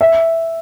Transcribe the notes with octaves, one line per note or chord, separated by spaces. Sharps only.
E5